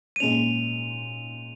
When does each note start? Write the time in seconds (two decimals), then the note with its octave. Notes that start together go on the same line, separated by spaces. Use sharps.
0.16 D#7
0.20 A#2 G#3 C#4 F7